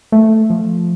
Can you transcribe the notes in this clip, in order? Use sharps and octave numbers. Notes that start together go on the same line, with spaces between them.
A3
F3